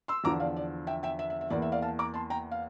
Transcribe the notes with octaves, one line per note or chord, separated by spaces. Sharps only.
C6 E6
E2 D3 F3 A#5 D6
D5 F5
D5
E5 G5
E5 G5
E5
E5
E5
E2 E3 A#3 D5
E5
D5 F5
F5 A5
A#5 D6
A5 C6
G5 A#5
F5